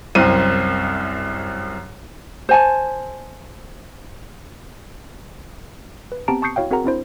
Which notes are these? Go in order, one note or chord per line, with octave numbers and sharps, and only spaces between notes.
C2 F#2 C4 D#7
C5 G#5 A5
B4
B3 C4 G4 A5 A#5 D7
A5 C#6 D#6 G6 C7 C#7
E4 F#4 C#5 F5 G5
C4 F#4 G#4 A#4 F#5 A#5
C4 D4 E4 C5